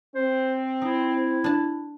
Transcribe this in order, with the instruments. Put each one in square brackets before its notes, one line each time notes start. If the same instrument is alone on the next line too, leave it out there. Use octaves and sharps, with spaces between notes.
[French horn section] C4 [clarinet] C5
[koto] D#4 [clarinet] E4
[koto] D4 A5